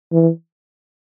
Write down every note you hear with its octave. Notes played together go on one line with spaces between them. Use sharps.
E3